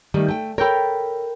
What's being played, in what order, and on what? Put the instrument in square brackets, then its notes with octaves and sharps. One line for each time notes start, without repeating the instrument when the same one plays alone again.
[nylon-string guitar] D#3 G3 A3
A3 G5
[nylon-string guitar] A4 C#5 [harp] A#4 G5 B5